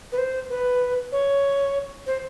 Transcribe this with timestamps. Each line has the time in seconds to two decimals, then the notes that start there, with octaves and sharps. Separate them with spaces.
0.12 B4
0.18 C5
0.50 B4
1.12 C#5
2.07 C5